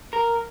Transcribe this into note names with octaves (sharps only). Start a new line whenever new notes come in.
A#4